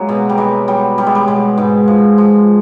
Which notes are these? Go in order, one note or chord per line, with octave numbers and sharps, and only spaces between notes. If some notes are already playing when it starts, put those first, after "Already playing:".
Already playing: F#3 G#3 A#3
B2
G3
B2 G#3
F#3 G3
F#3 G3
G#3
G3
B2 G#3
G#2
F3
F3